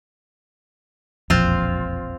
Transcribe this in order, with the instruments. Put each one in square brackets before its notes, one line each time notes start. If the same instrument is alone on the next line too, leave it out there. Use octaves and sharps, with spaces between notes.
[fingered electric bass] E1 A#1 F2 [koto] C4 F4